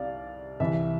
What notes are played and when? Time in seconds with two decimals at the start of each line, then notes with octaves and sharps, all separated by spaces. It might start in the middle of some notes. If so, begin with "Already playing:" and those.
Already playing: C2 D5 F5
0.60 C2 C3 E3 E5